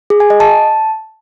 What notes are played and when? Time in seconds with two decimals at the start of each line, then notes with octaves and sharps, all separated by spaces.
0.10 G#4
0.20 G#5
0.30 D#5
0.40 A5